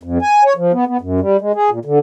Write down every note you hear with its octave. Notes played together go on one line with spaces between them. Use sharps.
F2
G#5
C#5
F3
B3
B3
F#2
G3
G#3
G#4
A#2
D3